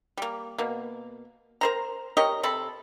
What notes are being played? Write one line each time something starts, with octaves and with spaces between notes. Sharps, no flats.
G3 A#3
B2 A#3
A#4 C5 A#5
G4 A#4 C#5 D#5
C3 A4 B5